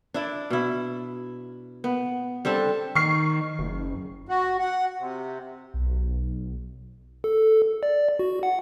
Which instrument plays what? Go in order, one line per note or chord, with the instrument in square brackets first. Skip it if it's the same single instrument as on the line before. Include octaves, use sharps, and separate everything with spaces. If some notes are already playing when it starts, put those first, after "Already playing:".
[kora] D4 E4 D5
B2 E4
B3
G3 C4 D4 A4
[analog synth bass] D#3 [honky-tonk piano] C#6 F6 C7
[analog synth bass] F#1
[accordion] F#4
F#5
C3
[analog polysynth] B1
[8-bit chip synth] A4
D5
F#4
F#5